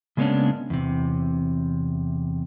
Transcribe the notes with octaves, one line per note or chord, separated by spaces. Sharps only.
C#3 G#3 A#3 B3 C#4 D4
E2 C3